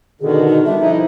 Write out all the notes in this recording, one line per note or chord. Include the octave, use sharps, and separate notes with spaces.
B2 D3 D#3 G#4
D#4
B2 G3 D4 E5
F3 D#4 E4